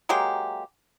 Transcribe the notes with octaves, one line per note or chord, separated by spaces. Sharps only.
F#3 G#3 A#3 G4